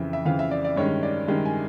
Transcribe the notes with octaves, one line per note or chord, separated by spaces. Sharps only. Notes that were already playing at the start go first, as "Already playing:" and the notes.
Already playing: F2 C#3 E3 E5
E5
F2 C#3 E3 F5
E5
D5
D5
G2 D#3 G#3 C#4 C#5
D5
G2 D#3 G#3 C#4
G#5